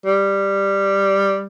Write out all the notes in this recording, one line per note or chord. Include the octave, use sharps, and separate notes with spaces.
G3